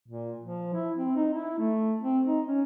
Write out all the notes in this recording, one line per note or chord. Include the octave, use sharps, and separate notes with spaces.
A#2
F3
E4
C4
D#4
E4
A3
C4
D#4
C#4